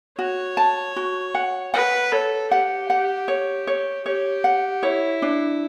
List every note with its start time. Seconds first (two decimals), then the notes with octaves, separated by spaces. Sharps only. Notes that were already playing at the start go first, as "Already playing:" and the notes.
0.18 F#4 C#5
0.57 A5
0.96 F#4
1.34 F#5
1.74 B4 F#5
2.12 A4 C#5
2.51 G4 F#5
2.90 F#5
3.28 C#5
3.67 C#5
4.06 G4 C#5
4.44 F#5
4.83 E4 C#5
5.22 D4